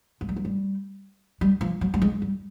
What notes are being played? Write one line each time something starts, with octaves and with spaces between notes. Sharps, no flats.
G#3
G3
F#3
G3
G3
F3
F#3
G3
G#3
G3